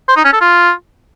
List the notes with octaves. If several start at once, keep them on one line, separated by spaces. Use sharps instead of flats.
C5
D#4
C#4
A4
F4